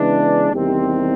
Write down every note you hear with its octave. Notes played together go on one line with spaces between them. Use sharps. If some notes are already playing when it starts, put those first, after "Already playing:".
Already playing: C#3 E3 G#3 B3 D4
E2 C3 D#3 G3 C4